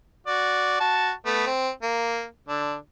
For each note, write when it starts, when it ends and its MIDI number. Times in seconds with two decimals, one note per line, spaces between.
0.27 0.80 66
0.27 0.80 74
0.80 1.12 66
0.80 1.12 81
1.26 1.46 57
1.26 1.46 59
1.47 1.69 60
1.83 2.25 58
2.48 2.75 50
2.48 2.75 62